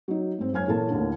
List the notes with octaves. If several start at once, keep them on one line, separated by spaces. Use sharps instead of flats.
F#3 D#4
G#2 C4
F#1 C#5 G#5 F6 G#6
A#2 E3 A4 C#5 A5
D#2 A2 D3